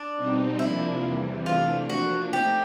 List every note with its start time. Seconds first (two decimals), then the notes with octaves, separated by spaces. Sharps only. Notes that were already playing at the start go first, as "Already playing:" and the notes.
Already playing: D4
0.15 B2 G3 C4 D#4
0.59 C3 F3 A#3 D4 E4
1.03 E2 C3 E3 G3
1.46 C3 E3 A3 D4 F4
1.89 F3 A#3 D4 F#4
2.33 A3 C4 D#4 G4